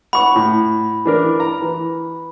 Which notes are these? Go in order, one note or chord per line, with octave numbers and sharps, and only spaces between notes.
F#5 B5 C#6
A2
E3 D4 A#4
A#5
E3